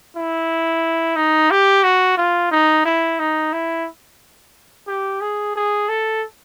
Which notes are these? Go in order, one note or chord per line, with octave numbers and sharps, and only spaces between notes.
E4
D#4
G4
F#4
F4
D#4
E4
D#4
E4
G4
G#4
G#4
A4